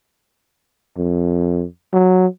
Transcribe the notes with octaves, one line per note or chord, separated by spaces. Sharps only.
F2
F#3